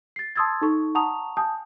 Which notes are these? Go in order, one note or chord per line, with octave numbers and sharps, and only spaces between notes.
A6 C7
A5 C6 D#6 E6 G#6 A6
D#4 A4 C#6
F#5 A5 A#5 C#6 D#6 F7
F#5 G#5 A5 D#6 G6